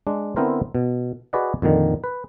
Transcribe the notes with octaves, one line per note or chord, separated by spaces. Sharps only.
G#3 D4
D3 B3 C4 E4 A#4 C5
B2
F#4 G#4 B4 D5 D#5 F#5
F2 A#2 D3 D#3
B4